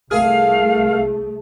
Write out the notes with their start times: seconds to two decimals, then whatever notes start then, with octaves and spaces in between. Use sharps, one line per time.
0.11 C2 A3 G#4 A#4 F5